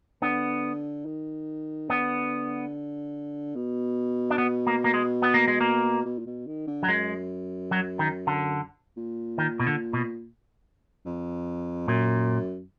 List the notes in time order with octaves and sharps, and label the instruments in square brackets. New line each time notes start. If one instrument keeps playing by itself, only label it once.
[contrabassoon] D3 [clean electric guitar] B3
[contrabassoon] D#3
[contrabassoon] D3 [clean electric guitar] B3
[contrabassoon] B2
[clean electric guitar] D4
B3
A#3
A#3
G#3
B3
A#3
G#3
A#3
[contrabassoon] B2
A#2
B2
D#3
D3
[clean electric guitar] F#3
[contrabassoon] F#2 [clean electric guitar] G#3
[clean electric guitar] F#3
D#3
D3
[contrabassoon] A#2
[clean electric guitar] D#3
B2
D3
B2
[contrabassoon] F2
[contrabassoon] F#2 [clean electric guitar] A#2